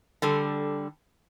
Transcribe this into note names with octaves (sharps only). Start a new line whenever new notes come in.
D3 G3 A4